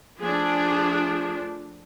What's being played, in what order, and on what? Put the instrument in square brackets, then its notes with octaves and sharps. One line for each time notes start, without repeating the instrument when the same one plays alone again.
[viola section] F3 A3 D4 G#4